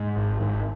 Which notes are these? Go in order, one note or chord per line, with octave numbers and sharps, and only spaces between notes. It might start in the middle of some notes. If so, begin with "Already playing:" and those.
Already playing: G#2
G#1
G#1